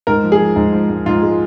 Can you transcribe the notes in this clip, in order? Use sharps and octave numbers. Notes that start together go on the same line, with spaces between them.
G#2 A#4
F3
G#4
F3
G#2
F3
G#2
G#2 F4
G#3